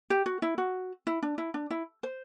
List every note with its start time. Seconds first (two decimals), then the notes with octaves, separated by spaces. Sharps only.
0.10 G4
0.26 F#4
0.42 E4
0.58 F#4
1.07 E4
1.23 D4
1.38 E4
1.54 D4
1.70 E4
2.03 C5